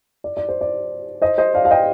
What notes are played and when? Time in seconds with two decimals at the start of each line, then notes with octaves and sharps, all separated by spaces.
0.24 D5
0.37 D5
0.49 C5
0.61 D5
1.22 C5 D#5
1.38 C5 D#5
1.54 D5 F5
1.65 F5
1.71 D#5 G5